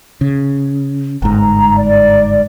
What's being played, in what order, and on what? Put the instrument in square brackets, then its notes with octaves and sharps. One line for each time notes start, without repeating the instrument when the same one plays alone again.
[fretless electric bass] C#3
[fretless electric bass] G1 G#2 [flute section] A#5
[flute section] D5